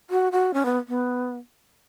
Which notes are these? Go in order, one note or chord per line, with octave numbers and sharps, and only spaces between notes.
F#4
F#4
C#4
B3
B3